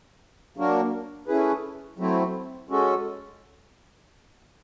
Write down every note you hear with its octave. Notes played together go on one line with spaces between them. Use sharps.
F#3 A#3 D4 F#4 A#4
A3 C#4 E4 G#4 B4
F#3 A3 C4 E4
G#3 C#4 F#4 A4